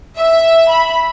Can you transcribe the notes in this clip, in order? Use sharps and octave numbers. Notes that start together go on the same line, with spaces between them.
E5
B5